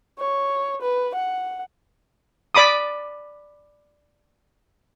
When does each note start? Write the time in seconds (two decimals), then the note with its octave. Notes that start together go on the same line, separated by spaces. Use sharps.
0.19 C#5
0.82 B4
1.15 F#5
2.55 D5 B5 D6 D#6